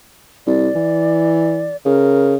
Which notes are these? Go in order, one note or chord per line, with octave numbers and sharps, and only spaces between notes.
C2 D5
E3
C#3 A#4